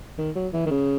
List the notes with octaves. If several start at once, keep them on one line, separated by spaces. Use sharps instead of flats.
D#3
F#3
E3
D#3
C#3